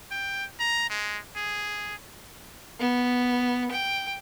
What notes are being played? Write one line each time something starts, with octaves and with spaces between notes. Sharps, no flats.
G5
A#5
G#3
G#4
B3
G5